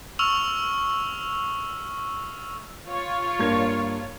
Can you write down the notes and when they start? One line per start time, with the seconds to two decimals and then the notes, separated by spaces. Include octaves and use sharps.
0.19 C#6 E6 F6 F7
2.87 F4 C#5
3.39 G2 A#3 G#6